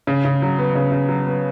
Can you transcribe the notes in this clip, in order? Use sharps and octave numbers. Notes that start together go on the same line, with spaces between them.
C#3
C#3
F#3
B3
C#3
C#3
F#3
B3